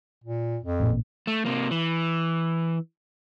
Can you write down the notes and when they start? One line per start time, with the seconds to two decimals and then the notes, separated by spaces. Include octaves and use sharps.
0.24 A#2
0.63 F2
0.80 A1 A#2
1.27 A3
1.46 C3 A#3
1.71 E3